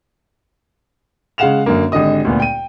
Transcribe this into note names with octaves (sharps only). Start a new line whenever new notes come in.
C#3 G#3 F5 F#5 E7 F7
F#2 D3 A#3
G#1 D3 G4 D#5 D#6
D2 A#2 B3
G5 D#7